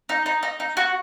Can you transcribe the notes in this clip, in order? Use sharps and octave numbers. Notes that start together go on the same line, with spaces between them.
D#4
D#4
D#4
D#4
F#4